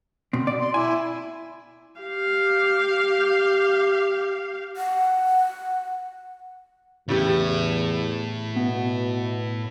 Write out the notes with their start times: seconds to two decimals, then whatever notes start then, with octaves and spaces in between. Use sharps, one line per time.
0.33 B2 C4
0.47 D5
0.60 C6
0.74 E4 G#5
2.01 G4 F5
4.77 F#5
7.08 E2 A2 C#3 E4 G4
8.56 B2 B3